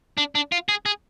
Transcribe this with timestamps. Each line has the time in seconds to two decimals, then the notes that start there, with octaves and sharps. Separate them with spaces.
0.18 D4
0.35 D4
0.52 F4
0.69 G#4
0.86 G#4